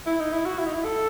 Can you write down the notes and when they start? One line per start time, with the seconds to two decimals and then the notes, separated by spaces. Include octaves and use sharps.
0.07 E4
0.20 D#4
0.33 E4
0.45 F#4
0.59 E4
0.66 D#4
0.74 E4
0.85 A4